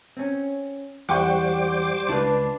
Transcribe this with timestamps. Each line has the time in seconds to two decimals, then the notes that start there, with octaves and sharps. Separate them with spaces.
0.17 C4 C#4
1.09 E2 G3 C5 F#5 G5 C#6 D6
2.09 C#2 D4 F4 B4